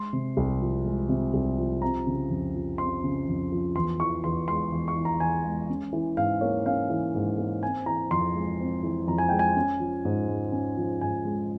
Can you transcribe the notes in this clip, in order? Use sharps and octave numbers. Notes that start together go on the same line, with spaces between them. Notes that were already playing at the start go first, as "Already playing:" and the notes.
Already playing: G#3 C6
C3
C2
F3
G#3
C3
C2
F3
C4 A#5
C#3
F2
F3
C4 C6
C#3
F2
F3
E2 C6
E3 C#6
E2 C6
G#3 C6
E2
C#6
E3
A#5
E2 G#5
G#3
C#4
E3
G#2 F5
A#3 C#5
C#4 F5
E3
G#2
A#3
C4 G#5
E3 A#5
F2 C6
G#3
C4
E3
F2 A#5
G#5
G#3 G5
G#5
C#4
F3
G#2
G#3
C#4
F3
G#2 G#5
G#3